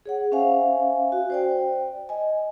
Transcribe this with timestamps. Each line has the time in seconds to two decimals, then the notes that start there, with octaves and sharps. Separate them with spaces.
0.06 G#4 C#5 F#5
0.32 C#4 C5 E5 F5 G#5
1.12 F#4
1.30 C5 D5 G5
2.09 D#5 G#5